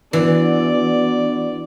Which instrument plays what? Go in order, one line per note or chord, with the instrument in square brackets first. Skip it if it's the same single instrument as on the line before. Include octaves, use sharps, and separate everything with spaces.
[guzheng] E3 [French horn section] B3 D4 F#4 [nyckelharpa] D5